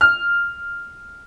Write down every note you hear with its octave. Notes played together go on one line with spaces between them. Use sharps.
F6